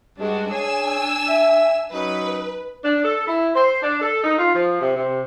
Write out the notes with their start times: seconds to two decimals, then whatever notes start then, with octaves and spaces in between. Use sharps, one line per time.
0.18 G2 G3 G#3 D4 F#4
0.50 D4 G#4 C#5 G#5 E6
1.27 E5
1.93 F#3 C#4 D#4 B4
2.84 D4
3.05 A4
3.28 E4
3.56 C5
3.83 D4
4.02 A4
4.24 D#4
4.39 F4
4.55 F3
4.82 C3
4.96 C3